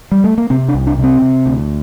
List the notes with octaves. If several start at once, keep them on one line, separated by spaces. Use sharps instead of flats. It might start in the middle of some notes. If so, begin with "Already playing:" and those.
G3
A3
A#3
C3 C4
D4
C2
D4
C3
C4
C3
D2